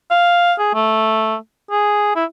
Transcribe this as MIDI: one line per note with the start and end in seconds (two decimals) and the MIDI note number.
0.10 0.53 77
0.58 0.72 68
0.74 1.35 57
1.71 2.13 68
2.15 2.24 64